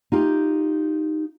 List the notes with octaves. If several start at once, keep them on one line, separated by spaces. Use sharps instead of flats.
D#4 F4 G4